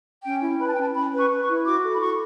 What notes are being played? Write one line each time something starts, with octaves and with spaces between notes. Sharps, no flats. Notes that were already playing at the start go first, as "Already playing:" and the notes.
C#4 G5
E4
B4 B5
A5
G5
C#4 A5
C#4 B5
B4
C#6
B4
C#6
E4
F#4 D6
A4
B5
F#4 C#6